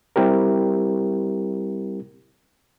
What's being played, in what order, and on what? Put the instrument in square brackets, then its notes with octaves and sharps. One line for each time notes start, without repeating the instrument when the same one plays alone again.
[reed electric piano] G3 C4 E4 G4 A#4